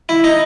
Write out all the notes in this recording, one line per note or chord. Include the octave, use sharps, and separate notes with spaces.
E4
D#4